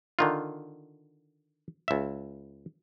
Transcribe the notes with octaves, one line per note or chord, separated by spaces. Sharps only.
D3 D#3 F4
C#2 E5